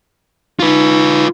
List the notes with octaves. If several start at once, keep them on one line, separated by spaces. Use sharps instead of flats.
D#4 F4 B4